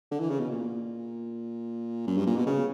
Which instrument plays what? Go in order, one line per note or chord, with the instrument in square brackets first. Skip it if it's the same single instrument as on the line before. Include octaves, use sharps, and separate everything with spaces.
[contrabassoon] D3
E3
C#3
B2
A#2
F#2
G2
A#2
B2
C#3